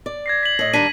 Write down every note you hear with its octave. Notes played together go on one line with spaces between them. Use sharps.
D5
G#6 A#6 C7
B6 F#7
A2 D#5
D#3 G3 D4 B6 D#7